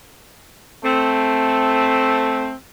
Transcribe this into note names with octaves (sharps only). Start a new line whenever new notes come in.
A3 C4